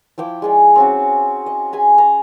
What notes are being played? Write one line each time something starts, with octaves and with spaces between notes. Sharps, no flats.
F3 E4 G5 D6
G#3 G#4 D5
C4 C#4 F#4
D#5
G#4 G#5 B5
A#5